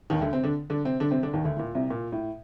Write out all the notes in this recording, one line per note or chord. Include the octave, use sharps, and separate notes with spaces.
D#2 D#3
D2 D3
C3 C4
D3 D4
D3 D4
C3 C4
D3 D4
C3 C4
D3 D4
D#2 D#3
D2 D3
A2
A#2
C2 C3
A#2
A2